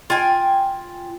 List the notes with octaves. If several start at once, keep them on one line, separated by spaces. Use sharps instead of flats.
F4 G5 G#5